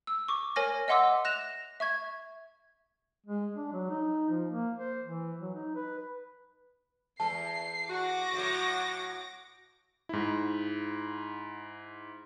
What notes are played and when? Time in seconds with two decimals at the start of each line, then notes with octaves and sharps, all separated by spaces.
0.07 E6
0.28 C#6 D6
0.56 A#4 C#5 G#5 F6 A#6
0.88 D#5 E5 F#5 C6 D6 E6
1.25 F#6 A#6 E7 F7
1.80 E5 C#6 G#6
3.26 G#3
3.55 D4
3.73 F#3
3.90 D#4
4.30 F3
4.49 A#3
4.79 C5
5.04 E3
5.41 F#3
5.55 D#4
5.75 B4
7.20 E2 A4 A5 C7
7.90 F#4 D6 A#6
8.34 A2 F#3
10.09 G#2 E4